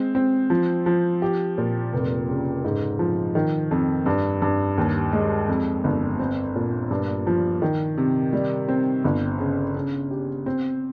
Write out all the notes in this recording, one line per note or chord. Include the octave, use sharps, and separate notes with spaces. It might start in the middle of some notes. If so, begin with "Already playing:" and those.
Already playing: G#3 C4
C4
F3
F3
G4
A#2
F1
C#3
G#2
F3
D#3
F2
G2
G2
D#2
G#3
F2
G1
C4
A#2
G2
F3
D#3
C3
G3
C4
G1
C#3
C#3
G4
C4